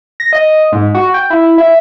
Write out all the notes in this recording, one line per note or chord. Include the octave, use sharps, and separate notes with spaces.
A#6
D#5
G#2
F#4
G5
E4
E5